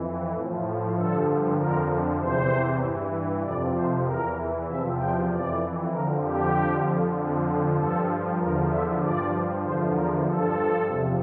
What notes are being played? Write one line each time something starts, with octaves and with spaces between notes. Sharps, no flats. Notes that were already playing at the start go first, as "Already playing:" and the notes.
Already playing: F2 E3
A2 F3
G2 D3 F3 A4
F2 D3 F3 A#4
E2 C3 E3 C5
G2 E3
F2 C3 F3 D5
C5
E2 E3 A#4
E2 C3 F3 E5
G5
F2 E3 D5
F2 D3 F3 A#4
G4
F2 D3 F3
F2 D3 F3
G2 F3 A4
E2 D3 F3 A#4
E5
G2 F3 D5
E2 D3 F3 C5
A#4
G2 F3 A4
E2 C3 F3